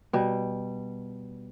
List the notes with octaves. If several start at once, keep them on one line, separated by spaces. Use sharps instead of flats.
B2 G3